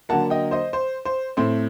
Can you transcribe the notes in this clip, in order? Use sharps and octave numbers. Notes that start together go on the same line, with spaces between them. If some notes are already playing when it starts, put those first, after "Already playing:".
D3 F#3 A#3 F#5 A5
D#5 G5
C5 D#5
C5
C5
A2 A3 C4 C5